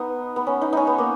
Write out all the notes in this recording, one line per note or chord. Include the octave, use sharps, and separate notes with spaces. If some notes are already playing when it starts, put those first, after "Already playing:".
Already playing: B3 D#4
B3
C#4
D#4
C#4 D#4
B3
A#3